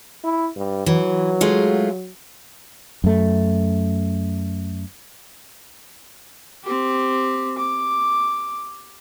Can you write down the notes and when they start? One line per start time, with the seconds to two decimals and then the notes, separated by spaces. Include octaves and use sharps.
0.24 E4
0.56 G2
0.86 E3 F#3
1.41 G#3 A3 F4
3.04 F#2 A3
6.64 C4 G4
7.58 D6